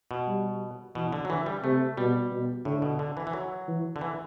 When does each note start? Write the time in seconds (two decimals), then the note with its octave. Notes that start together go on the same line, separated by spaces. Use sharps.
0.11 B2
0.27 G3
0.95 B2 E3
1.13 D3
1.25 F#3
1.29 D3 E3
1.46 G3
1.63 C3 A3
1.97 B2 G3
2.31 B2
2.65 A2 D3
2.82 B2
2.99 D3
3.17 E3
3.27 E3
3.33 F#3
3.68 E3
3.96 D3
4.01 E3